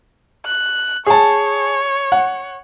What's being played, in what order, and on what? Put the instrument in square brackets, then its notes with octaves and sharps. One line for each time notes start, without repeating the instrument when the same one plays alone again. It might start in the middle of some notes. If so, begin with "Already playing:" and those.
[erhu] F#6
[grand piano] G#4 A5 [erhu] C#5
[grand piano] F#5